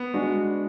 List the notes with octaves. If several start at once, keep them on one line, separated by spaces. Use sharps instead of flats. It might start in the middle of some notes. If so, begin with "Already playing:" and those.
Already playing: B3
G#3 D4 F#4